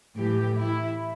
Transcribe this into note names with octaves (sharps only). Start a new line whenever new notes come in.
A2 E3 G4
E4